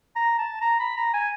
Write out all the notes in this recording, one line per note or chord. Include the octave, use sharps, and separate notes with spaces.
A#5
A5
A#5
B5
A#5
G#5